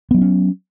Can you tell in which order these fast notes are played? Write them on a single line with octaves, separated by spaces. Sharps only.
B3 F#3 D4 C#4